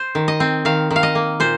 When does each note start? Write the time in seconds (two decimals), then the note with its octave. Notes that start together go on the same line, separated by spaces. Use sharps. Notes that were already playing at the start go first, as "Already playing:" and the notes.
Already playing: C5
0.15 D#3
0.28 D#5
0.40 C4
0.65 D#3 F5
0.91 D#3
0.96 F5
1.03 D#5
1.15 A#3
1.40 A#2 C5